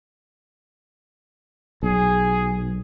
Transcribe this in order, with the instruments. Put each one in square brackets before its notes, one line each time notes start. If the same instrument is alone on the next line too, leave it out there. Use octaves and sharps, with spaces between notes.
[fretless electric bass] B1 [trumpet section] G#4